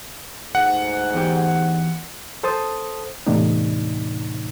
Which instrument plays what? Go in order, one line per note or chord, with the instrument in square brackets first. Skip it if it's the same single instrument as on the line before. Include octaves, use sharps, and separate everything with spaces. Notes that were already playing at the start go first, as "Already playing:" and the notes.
[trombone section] D2 G#2 [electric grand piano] F#5
[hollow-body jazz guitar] E2 G4
[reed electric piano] A4 C5 A5 D#6
E2 A2 C3 D4 D#4